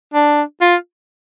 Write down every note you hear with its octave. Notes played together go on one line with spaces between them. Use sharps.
D4
F4